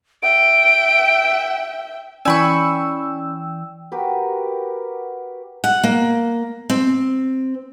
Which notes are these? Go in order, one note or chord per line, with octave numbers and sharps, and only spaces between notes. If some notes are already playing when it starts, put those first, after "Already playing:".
E5 G5 D7
E3 C#4 D5 G5 G#5 B5 C#6 E6
F#4 G4 A#4 B4
F#5
A#3
C4